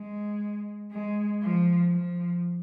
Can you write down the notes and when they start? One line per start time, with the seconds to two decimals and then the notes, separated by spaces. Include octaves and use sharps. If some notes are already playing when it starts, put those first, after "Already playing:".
Already playing: G#3
0.92 G#3
1.42 F3
1.91 F3